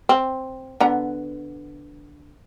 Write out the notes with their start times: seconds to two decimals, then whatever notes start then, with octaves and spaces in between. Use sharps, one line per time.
0.09 C4
0.80 D3 B3 A#5